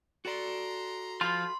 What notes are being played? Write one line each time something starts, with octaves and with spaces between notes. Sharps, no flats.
F#4 A4 D5 A#5 C6
F3 F4 B5 C6